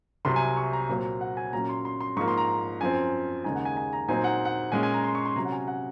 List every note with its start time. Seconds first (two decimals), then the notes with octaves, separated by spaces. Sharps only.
0.25 C2 C3 F#3 C6
0.36 G#5
0.57 C#6
0.73 A#5
0.89 A#2 F#3 C4
1.21 F#5
1.37 G#5
1.53 A#2 F#3 C#4 A#5
1.69 C6
1.85 C6
2.01 C6
2.16 G#2 F3 A#3 C#6
2.28 C6
2.38 A#5
2.80 F#2 F3 C4 G#5
3.44 D#2 C#3 G#3 D#4 G#5
3.55 F#5
3.65 G#5
3.77 G#5
3.93 A#5
4.08 A#2 F#3 C4 D#4 G#5
4.24 F#5
4.45 F#5
4.72 A#2 G#3 C#4 G#5
4.83 G#5
4.94 A#5
5.04 C6
5.15 C#6
5.25 C6
5.36 C3 F#3 C#4 A#5
5.45 F#5
5.52 G#5
5.68 F#5